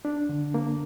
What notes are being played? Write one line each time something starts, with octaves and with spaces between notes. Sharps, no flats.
D4
D3
A#3